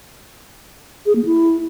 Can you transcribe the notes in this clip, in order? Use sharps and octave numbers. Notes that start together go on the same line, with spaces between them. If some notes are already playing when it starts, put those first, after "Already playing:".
G#4
A#3
E4